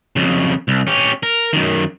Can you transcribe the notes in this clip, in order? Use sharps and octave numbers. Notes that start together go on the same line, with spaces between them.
F2 C#3
C2
C#4 G4
A#4
F#2 D#3